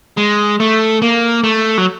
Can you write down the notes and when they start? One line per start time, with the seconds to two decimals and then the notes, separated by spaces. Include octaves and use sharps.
0.17 G#3
0.60 A3
1.02 A#3
1.44 A3
1.78 F#3